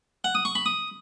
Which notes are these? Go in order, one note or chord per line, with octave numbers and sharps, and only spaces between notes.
F#5
D#6
C#6
B5
D#6